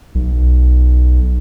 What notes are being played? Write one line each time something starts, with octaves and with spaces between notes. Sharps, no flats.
B1